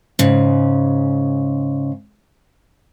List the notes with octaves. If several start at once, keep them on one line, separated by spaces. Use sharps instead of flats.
G#2 C#3